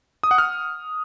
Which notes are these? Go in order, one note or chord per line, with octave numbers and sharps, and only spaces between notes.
D#6
F#5
F6